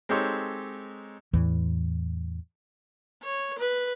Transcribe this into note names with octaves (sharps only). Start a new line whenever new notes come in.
G#3 C4 D#4 G4 A4 C#5
E2 A2 E3
C#5
B4